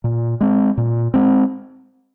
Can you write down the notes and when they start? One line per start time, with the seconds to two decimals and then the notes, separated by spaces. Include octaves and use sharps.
0.04 A#2
0.41 G#3 C4
0.77 A#2
1.14 G#3 C4